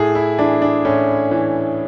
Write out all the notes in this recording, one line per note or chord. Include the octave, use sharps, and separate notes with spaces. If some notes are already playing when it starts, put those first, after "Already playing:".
Already playing: A2 G#4
E4
E3 D4
D4
A2 C#4
E3